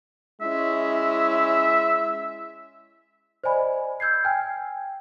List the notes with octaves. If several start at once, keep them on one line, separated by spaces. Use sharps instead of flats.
G#3 C#4 E4 E5
C5 D5 D#5 G#5 B5
E6 G6 G#6 C7
G5 G#5 F6